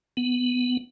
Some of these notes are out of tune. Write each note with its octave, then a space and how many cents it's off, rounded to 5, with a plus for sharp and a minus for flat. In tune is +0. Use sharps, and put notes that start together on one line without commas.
B3 +10